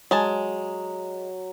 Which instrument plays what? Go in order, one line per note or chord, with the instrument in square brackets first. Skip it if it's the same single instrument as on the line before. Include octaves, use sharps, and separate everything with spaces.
[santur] F#3 [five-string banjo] G#3 G#5 A5